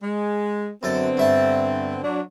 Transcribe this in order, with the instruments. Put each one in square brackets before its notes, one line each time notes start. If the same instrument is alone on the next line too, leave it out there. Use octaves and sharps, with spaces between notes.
[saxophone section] G#3
[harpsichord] F#2 A4 [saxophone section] D3 B3 C4
[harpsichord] G2 E5 A5
[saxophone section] F#3 D4